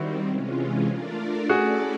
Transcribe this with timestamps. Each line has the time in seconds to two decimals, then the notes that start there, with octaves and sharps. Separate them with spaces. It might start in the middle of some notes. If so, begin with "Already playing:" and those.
Already playing: D#3 G3 C4 E4 F#4
0.28 C3 E3 G#3 C#4 F4
0.89 A3 D4 F4 A#4 D5
1.49 A3 C#4 E4 F#4 G#4 A4 D5